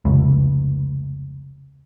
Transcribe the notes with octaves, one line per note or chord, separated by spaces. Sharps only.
F1 C#2